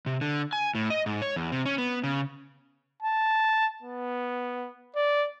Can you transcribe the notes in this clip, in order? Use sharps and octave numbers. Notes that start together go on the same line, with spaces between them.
C3
D3
G#5
A2
D#5
G#2
C#5
E2
C3
C#4
B3
C#3
A5
B3
D5